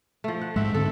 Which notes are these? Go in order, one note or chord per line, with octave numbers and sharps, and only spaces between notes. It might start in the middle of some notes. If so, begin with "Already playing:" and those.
F3 A3
F#5
G#2 G#3 C4 E5 F#5
G#2 D3 C4 A4